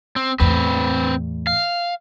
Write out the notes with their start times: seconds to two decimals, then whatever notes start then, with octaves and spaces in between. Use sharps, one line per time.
0.16 C4
0.40 E2 A2 C4 B4
1.47 F5